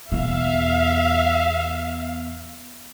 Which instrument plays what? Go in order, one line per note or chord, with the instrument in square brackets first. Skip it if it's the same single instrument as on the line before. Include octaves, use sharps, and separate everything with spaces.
[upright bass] E2 B2 [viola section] E5 F5